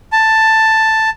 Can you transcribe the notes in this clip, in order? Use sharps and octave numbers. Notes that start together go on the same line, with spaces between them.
A5